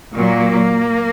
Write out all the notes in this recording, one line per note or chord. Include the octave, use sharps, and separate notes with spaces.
A#2 F#3 A#3